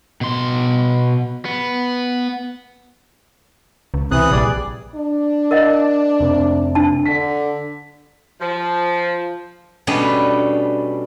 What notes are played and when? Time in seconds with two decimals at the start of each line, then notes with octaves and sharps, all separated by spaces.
0.21 B2 C6
1.45 B3
3.94 C#2
4.11 C3 E3 D#6 F#6
4.32 A#1 G3 G#4 D5
4.95 D4
5.51 A#4 D#5 F5
6.19 F1
6.75 D4 A5
7.06 D3 B6
8.41 F3
9.87 B2 G3 A3 B3 C#4 D4